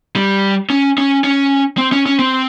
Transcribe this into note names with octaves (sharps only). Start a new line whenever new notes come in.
G3
C#4
C#4
C#4
C4
C#4
C#4
C4